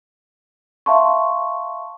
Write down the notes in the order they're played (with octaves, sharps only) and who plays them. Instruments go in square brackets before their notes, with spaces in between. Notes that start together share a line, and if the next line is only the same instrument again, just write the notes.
[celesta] E5 F5 A5 C6 C#6